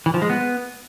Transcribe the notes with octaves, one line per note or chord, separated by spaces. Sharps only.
E3
F3
G#3
B3